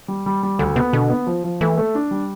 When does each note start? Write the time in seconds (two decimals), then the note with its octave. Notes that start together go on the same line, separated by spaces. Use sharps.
0.08 G3
0.26 G3
0.43 G3
0.59 D2 D3
0.76 C3 B3
0.93 B2 D3
1.10 B3
1.27 F3
1.44 F3
1.61 E3 A3
1.77 A3
1.95 D4
2.11 G3